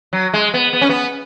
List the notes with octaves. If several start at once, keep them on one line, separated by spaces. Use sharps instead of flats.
F#3
G#3
B3
B3
C#4
B3